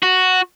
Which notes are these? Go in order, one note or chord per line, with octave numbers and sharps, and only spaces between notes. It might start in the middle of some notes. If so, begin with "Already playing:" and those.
F#4